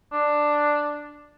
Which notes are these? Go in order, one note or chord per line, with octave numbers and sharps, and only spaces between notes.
D4